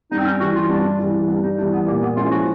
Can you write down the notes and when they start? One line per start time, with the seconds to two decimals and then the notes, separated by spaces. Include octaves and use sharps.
0.12 G2 D#4
0.19 C4
0.26 C#4
0.40 E3 G3 F#4
0.56 F4
0.69 G2 D4
0.99 E3 G3
1.28 G2 D4
1.43 D#4
1.58 E3 G3 D4
1.73 B3
1.87 A#2 A#3
2.02 B3
2.17 F3 G#3 C#4 E4 F4
2.31 F#4